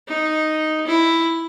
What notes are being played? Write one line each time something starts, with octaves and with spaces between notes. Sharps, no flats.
D#4
E4